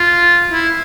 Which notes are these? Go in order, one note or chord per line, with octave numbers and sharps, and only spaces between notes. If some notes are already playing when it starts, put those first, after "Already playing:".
Already playing: F4
E4